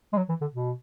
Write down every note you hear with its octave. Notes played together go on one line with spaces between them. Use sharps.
G#3
F#3
E3
D3
B2